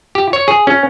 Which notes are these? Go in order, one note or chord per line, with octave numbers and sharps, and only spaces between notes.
G4
C#5
G#4
C#4